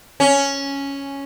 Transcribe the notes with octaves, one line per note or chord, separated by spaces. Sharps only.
C#4